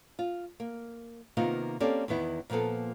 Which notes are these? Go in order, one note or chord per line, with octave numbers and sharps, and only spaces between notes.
F4
A#3
C3 D#3 A#3 B3 D#4 F4
A#3 C4 C#4 G4 A4 D5
E2 D#3 B3 E4
A#2 F3 A#3 B3 A4